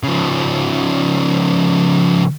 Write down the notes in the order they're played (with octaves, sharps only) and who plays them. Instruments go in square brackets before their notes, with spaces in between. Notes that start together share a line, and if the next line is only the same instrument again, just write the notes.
[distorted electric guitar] C#3 F3